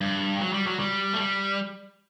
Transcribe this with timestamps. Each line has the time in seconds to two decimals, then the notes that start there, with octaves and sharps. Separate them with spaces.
0.01 G2
0.41 F#3
0.53 G3
0.66 F#3
0.79 G3
1.13 A3
1.18 G3